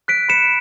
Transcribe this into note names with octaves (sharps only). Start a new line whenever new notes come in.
F#6 B6 D7
B5 C#7 E7